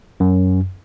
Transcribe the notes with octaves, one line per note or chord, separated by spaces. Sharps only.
F#2